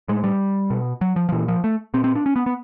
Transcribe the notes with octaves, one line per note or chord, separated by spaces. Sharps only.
A2 G#3
G3
B2
F#3
F3
F3
A#2 E3
F3
A3
A#2 C4
C4
D4
C#4
B3
B3